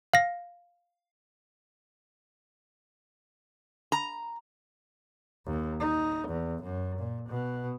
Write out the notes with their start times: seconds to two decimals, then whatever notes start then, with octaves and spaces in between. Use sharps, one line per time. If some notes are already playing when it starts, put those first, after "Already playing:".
0.14 F5 A#6
3.92 A#5
5.46 D#2
5.80 D#4
6.28 E2
6.63 F#2
6.99 A#2
7.29 B2